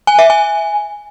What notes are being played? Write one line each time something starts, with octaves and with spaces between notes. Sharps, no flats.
G#5
E5
G#5